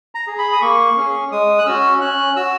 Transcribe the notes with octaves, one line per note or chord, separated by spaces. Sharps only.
A#5
G#4
B5
D#6
A#3 C#6
C#4 G#4
G#3 D#6
F#6
C#4 F#4 E6
C#4 F#6
F#4 E6